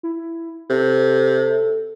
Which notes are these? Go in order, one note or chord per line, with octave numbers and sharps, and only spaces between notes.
E4
C3 A4